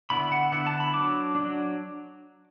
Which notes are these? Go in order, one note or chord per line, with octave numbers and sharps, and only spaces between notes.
D3 B3 E4 B5
F#5
D3 B3 E4 F#5
A5
B5
F#3 D4 D6
F#3 D4